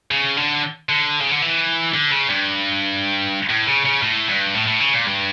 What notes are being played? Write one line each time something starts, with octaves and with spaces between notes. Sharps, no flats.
C#3
D3
D3
C#3
D3
E3
D3
C#3
G2
A2
C#3
C#3
A2
G2
A2
A2
C#3
A#2
G2